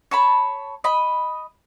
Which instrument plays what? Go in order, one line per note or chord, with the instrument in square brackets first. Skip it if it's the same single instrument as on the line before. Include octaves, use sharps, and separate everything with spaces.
[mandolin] C#5 A5 B5
D#5 B5